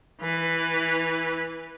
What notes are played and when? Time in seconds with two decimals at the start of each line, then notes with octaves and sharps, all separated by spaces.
0.21 E3 B4